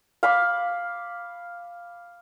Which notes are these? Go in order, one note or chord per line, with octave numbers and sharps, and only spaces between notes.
F5 B5 D6